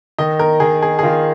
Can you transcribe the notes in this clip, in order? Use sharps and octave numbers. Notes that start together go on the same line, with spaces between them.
D#3 D#5
A#4
D#3 G#4
G#4
G#4
D#3 F4